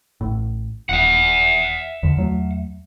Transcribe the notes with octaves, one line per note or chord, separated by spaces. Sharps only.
A1 A2
D#1 E5 F#5
E2 G2 D3
E2 F#3 A3